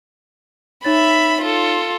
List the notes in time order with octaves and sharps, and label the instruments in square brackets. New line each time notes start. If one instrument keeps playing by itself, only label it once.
[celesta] D#4 C#5 A6 [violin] E5 B5
[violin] F4 A4